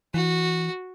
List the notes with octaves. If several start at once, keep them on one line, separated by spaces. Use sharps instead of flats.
E3 F#4